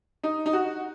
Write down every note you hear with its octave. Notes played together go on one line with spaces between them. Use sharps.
D#4
D#4
F#4